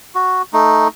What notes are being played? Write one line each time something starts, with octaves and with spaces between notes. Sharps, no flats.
F#4
A3 D#4